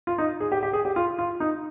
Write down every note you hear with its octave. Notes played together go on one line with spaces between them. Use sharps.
F4
D#4
G#4
G4
G4
G#4
G4
F4
F4
D#4